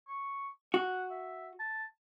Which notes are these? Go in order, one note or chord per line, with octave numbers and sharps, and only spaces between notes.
C#6
F#4 F#5
E5
A5